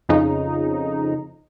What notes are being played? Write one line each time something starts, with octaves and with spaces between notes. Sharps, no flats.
F2 C#3 D#4